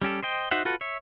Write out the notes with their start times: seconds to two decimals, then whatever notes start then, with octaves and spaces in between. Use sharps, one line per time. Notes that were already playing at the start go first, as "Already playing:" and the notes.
0.02 G3 C#4 G4 A4
0.23 C5 D#5 G5
0.51 D#4 F#4 C5 E5 F#5
0.65 F4 F#4 A4 B4
0.81 C#5 E5